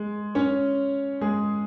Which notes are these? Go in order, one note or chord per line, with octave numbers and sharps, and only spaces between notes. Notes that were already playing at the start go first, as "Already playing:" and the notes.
Already playing: G#3
C#4 C#5
G#3 G#4